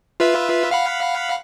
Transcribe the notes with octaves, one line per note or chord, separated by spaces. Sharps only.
F4 B4 E5
F5 F#5 B5